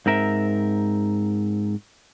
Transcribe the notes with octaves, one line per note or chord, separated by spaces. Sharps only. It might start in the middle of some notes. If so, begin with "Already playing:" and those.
G#2 C4 A#4 E5